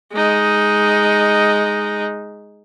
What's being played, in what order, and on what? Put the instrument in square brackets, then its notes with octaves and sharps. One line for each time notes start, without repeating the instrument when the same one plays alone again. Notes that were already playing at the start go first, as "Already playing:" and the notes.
[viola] G#3 D#4